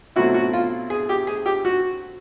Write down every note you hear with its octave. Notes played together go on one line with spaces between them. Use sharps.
B2 F#3 A3 C4 E4 F#4
F#4
F4
G#4
G4
G#4
G4
F#4